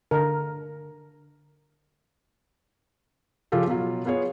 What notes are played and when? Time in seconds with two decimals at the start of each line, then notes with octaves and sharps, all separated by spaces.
0.11 D3 A#4
3.52 C#3 F3 F4 G4 A4
3.68 B2 F#3 F4
4.05 B3 F4 G#4 C#5